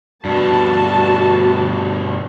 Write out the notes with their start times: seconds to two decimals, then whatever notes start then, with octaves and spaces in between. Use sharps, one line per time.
0.25 G2 B2 F#4 A5